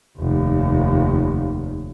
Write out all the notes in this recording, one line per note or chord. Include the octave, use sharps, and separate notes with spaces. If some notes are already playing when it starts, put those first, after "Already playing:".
F1 D#2